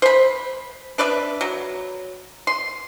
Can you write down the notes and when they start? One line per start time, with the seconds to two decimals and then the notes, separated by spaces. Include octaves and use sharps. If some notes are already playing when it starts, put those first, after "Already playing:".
0.02 C5 B5
0.98 D4 B4 D5 E5
1.41 F#3
2.47 C6